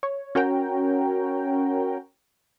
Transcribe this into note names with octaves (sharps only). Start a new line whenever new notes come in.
C#5
C#4 F#4 A#4 C#5 G5 A#5